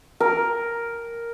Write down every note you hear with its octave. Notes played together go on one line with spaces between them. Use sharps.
A#4